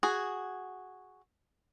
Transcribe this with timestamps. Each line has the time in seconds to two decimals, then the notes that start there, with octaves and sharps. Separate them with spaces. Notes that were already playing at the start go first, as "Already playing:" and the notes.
0.03 F#4 G#4